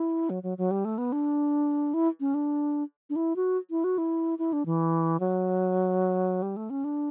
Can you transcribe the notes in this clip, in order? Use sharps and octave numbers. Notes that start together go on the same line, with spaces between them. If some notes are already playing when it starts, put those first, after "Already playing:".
Already playing: E4
F#3
F#3
F#3
G3
A3
B3
D4
E4
C#4
D4
D4
E4
F#4
E4
F#4
E4
E4
D4
E3
F#3
G3
A3
C#4
D4